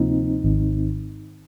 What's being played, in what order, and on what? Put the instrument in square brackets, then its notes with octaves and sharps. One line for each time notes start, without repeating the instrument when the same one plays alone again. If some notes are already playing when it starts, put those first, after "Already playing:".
Already playing: [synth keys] D2 C3 F3 A#3 F4 [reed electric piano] C4 D#4
[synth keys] G#1 G#2 D#3